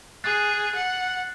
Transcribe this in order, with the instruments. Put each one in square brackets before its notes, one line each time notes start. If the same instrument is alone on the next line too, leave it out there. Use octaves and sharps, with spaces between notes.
[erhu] G#4 [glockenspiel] F#6 A6 C7
[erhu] F#5